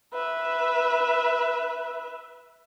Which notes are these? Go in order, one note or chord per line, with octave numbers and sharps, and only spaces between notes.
B4 E5